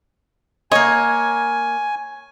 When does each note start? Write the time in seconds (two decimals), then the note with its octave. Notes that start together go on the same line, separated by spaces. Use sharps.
0.72 A#3 C#5 D#5 G#5